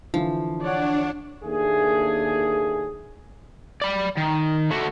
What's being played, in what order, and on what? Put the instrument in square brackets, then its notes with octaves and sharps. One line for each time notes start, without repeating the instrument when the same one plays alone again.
[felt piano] D3 E3 [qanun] F3
[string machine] D4 [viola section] C#5 D5 F#5
[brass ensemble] D#2 A3 A#3 D4 G#4
[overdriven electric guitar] D5 B5
D#3
A3 F#4